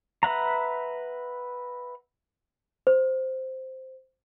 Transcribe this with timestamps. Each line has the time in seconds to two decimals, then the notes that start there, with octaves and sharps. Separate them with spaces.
0.23 B4 E5 F#5 A#5
2.87 C5